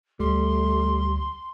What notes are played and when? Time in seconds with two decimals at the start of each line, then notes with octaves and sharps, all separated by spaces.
0.20 D2 G3 A3 C6